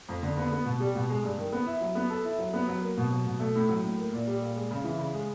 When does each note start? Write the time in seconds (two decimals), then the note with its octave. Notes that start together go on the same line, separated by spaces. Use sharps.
0.09 F2
0.23 D3
0.37 B3
0.51 B3
0.65 B2
0.80 G3
0.95 B2
1.10 G#3
1.24 G2
1.38 D#3
1.52 B3
1.67 E4
1.81 F#3
1.95 B3
2.10 A4
2.25 E4
2.39 F#3
2.54 B3
2.67 F#3
2.82 A#3
2.97 B2
3.11 F#3
3.26 B2
3.40 A3
3.55 A2
3.68 F#3
3.83 A2
3.97 A#3
4.13 A#2
4.27 G3
4.41 A#2
4.56 G#3
4.71 C#3
4.84 E3
4.99 C#3
5.14 G#3